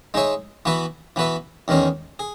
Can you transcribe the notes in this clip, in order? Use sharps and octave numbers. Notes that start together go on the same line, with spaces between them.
G#3 D#4 G#4 C#5 E5
E3 B3 F#4 B4 E5
E3 B3 F#4 B4 E5
E2 D#3 G#3 C#4 G#4
G#4